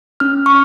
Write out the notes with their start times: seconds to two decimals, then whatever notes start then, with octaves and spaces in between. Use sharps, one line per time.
0.20 C#4 F6
0.46 C#6